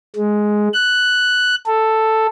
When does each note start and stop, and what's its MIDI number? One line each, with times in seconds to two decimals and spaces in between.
0.16 0.69 56
0.73 1.55 90
1.66 2.26 69